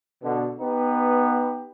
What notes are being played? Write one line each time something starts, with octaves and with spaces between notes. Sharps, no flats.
B2 D3
B3 D#4 G4 B4